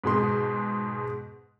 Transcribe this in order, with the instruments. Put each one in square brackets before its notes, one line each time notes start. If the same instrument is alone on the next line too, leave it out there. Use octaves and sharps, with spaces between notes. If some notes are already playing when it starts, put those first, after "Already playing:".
[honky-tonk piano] G#2 B2 G#3 C6